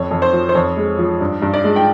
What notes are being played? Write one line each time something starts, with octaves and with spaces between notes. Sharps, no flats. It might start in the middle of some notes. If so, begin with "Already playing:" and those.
Already playing: F2 C#5
F2
C5
F3
C5
F2 C#5
G#3
F3
G2
G2
D5
G#3
G5